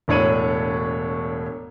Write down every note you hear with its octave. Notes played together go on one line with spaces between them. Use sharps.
E1 A2 D4 C#5 D#7 F#7